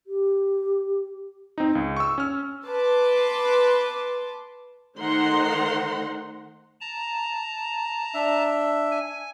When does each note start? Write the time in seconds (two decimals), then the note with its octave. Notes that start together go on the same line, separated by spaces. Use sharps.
0.07 G4
1.58 C4 D#4
1.75 C#2
1.97 C#6 E6
2.18 C#4 F6
2.68 B4 A5 C6 D6
4.97 D#3 A3 C5 F#5 A#5 C6
6.81 A5 A#5
8.14 D4 E5
8.91 G#5